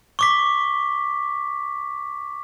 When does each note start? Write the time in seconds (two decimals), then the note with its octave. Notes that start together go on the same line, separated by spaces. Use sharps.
0.19 C#6 D6 B6